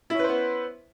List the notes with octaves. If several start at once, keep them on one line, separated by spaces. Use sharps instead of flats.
B3 C#4 E4 B4 C5